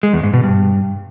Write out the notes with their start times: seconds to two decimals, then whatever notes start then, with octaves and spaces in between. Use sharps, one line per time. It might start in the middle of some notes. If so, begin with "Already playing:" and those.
0.03 G#3
0.13 E2
0.23 G#2
0.34 B2
0.44 G2